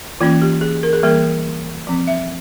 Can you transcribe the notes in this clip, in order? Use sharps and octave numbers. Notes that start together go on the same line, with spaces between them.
E3 A#3 C#4 F4
G4
G#4
A#4
G#4
E3 G3 A#3 A#4
F3 C4
E5